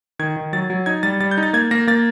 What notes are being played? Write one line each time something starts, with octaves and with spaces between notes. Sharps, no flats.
D#3 G#6
D#3
F#3 A6
F#3
D#4 G#6
G3 A6
G3 A6
G6
D#4
A6
A#3 G#6
A#3 A#6
A#3 A6